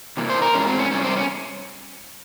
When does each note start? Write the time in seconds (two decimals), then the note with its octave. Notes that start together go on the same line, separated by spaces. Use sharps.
0.17 C3 E3 A#3
0.30 C5
0.42 A#4
0.54 G#2 E3 G#3 C#4
0.67 C4
0.79 C#4
0.91 E2 C3 G3 C#4
1.04 C4
1.16 C#4